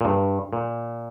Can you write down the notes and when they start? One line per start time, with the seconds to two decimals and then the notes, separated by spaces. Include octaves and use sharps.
0.01 A#2
0.05 G2
0.53 A#2